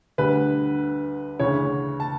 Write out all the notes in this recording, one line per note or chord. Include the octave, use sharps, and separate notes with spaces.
D2 D3 G3 B4
D2 C#3 E3 C#5
A5